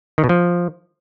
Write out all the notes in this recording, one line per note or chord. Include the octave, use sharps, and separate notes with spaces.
D#3
B2
F3